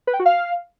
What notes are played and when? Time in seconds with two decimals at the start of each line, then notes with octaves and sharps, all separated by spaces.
0.07 B4
0.13 G5
0.19 F#4
0.26 F5